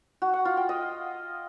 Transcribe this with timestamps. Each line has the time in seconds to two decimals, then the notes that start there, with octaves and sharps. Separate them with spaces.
0.22 F#4
0.33 F#5
0.45 F4
0.57 G5
0.69 D#5